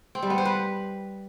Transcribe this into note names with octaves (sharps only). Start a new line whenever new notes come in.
C4
G3
B3
C5
B4